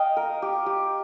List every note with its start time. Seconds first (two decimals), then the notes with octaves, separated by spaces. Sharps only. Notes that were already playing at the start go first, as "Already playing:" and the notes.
Already playing: D#5 F5 G5
0.17 A#4
0.42 G4
0.66 G4